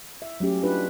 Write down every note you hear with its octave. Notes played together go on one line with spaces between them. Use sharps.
E5
F#3 A3 C#4 G4
D4 D#4 F4 G4 B4